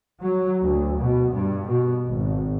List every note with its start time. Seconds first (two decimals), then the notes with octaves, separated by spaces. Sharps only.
0.21 F#3
0.63 D2
0.98 B2
1.33 G2
1.69 B2
2.06 G#1